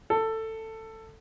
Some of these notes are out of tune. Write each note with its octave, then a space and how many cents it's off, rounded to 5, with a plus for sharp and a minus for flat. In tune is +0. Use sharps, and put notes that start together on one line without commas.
A4 +15